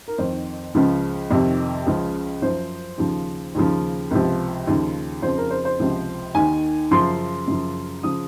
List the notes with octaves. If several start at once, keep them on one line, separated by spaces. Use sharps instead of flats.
A#4
F2 D#3 C5
C#2 C#3 F3
F2 C3 D#3
C#2 C#3 F3
F#2 F3 C5
D#2 C#3 F3
D#2 C#3 F3
C#2 C3 F3
D#2 C#3 F3
F2 C#3 F3 C5
A#4
C5
C5
C#2 C3 F3
D#2 D#3 G#5
F#2 C#3 F3 C6
F#2 C#3 F3
C#3 F3 D#6